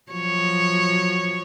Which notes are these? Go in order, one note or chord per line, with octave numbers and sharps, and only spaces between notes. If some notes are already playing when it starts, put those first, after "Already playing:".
F3 F#3 C#5